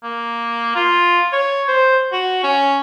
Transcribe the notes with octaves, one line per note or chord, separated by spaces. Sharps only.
A#3
F4
C#5
C5
F#4
C#4